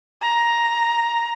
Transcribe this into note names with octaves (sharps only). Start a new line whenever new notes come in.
A#5